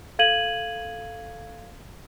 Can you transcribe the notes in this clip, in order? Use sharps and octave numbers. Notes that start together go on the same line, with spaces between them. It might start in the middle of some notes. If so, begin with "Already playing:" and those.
A4 F5 G#6 D#7 F#7